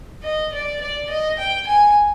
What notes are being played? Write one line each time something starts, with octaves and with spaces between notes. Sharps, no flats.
D#5
D5
D5
D#5
G5
G#5